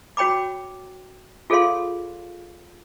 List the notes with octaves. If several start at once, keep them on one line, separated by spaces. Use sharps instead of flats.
F#4 C#5 G5 B5 D6
F4 G#4 A4 C#5 F5 C6